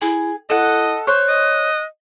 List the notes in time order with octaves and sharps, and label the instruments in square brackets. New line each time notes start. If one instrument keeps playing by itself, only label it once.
[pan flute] E4 [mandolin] G#4
[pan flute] E4 [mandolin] A4 F#5 [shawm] D#5
[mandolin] C5 C#5 [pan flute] F#6
[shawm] D#5